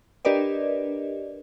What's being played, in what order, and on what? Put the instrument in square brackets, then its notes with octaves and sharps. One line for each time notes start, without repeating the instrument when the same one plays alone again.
[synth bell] D4 G4 A#4 B4 D5 D#5